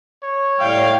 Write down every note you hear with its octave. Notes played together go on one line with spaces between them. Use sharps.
C#5
A2 G3 F5 G5